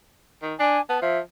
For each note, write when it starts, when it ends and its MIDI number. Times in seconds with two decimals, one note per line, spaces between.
0.42 0.54 51
0.59 0.79 62
0.59 0.81 80
0.89 0.99 59
0.89 0.98 81
1.02 1.20 53
1.02 1.19 76